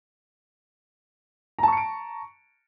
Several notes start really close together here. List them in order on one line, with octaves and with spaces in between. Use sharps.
A#5 A5 C#6 C#7 D7